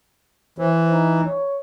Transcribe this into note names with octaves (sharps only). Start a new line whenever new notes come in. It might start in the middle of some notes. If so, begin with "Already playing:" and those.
E3 C5
D#4
C#5